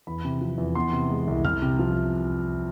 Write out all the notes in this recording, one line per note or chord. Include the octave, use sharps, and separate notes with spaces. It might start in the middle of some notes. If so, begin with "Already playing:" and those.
E2 B5
C3
F3
E2
B3 C6
C3
G#3
C2
C2 F6
C3
F3